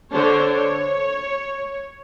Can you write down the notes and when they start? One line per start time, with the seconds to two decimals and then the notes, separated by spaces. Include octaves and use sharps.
0.13 D3 D4 C5 C#5
0.55 C#5